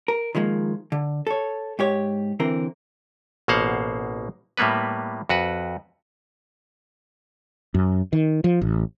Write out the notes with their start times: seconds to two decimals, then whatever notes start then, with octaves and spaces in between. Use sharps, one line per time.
0.08 A#4
0.35 D#3 F3 G#3 A#3
0.92 D3
1.27 A4 C#5
1.79 G#2 G4 C#5
2.40 D3 E3 C4 A#4
3.48 A1 B2 A#3 C5 F5 F#5
4.57 A2 G3 A#3 B3 B4
5.29 F2 F#4 B4
7.74 F#2
8.13 D#3
8.44 F3
8.62 A1